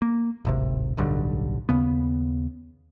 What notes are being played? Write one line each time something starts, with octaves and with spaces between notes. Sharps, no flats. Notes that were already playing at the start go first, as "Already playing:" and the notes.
A#3
D1 G#1 C3
D1 B1 G2 D3
D#2 C#3 B3